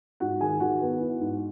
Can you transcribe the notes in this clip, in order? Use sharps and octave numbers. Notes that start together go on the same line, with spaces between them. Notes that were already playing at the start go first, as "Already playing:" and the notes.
G#2 F#4 F#5
D#3 G#4 G#5
D#3 F#4 F#5
B3
E4
G#2